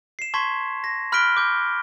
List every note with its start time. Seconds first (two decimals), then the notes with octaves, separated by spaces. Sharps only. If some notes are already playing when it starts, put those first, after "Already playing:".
0.19 C7 E7
0.34 A5 C6 C#6 G#6 B6
0.84 A#6
1.12 B5 F6 F#6 B6 D7 G7
1.37 D6 G6